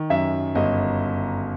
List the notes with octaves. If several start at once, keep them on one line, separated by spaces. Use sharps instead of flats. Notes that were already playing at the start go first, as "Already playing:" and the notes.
Already playing: D#3
F#2 E5
G1 D#5